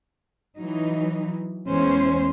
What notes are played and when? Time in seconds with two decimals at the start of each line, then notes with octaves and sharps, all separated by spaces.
0.58 E3 F#3 D#4
1.68 E2 G#3 C#4 C5